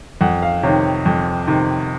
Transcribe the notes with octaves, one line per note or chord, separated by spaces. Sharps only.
F2 F#5
F5
C3 D#3 C#5
F2
C3 D#3